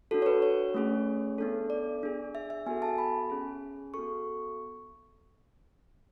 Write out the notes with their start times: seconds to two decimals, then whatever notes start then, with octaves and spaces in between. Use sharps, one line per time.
0.11 D4 F#4 A4
0.22 C#5
0.26 B4
0.42 C#5
0.74 A3 C#4 G#4
1.38 B3 D4 A4
1.70 D5
2.03 D4 G#4
2.35 E5
2.50 E5
2.66 B3 F#4 A4 G#5
2.82 A5
2.98 B5
3.30 C#4 G#4
3.94 B3 F#4 A4 C#6